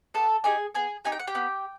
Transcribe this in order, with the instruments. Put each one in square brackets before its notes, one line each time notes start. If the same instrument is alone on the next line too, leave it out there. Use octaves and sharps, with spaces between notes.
[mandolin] B3 A4 A5
D#4 G4 G#4 G#5
B3 G#4 G#5
D#4 G4 G#5
G5
F#5
G4 G5
B3